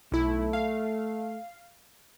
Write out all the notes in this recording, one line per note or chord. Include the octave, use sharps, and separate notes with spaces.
B1 A3 E4
F5